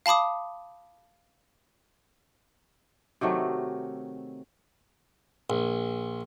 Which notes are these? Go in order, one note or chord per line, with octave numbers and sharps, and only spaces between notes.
F5 A5 B5 D6 D#6
C3 D#3 F#3 A3
A#1